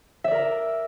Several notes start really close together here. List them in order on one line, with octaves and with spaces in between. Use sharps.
E5 D5 A#4 A#5